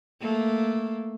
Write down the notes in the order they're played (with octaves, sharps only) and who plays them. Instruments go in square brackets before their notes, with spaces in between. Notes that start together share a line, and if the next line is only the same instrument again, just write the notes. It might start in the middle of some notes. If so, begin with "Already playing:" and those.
[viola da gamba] A3 A#3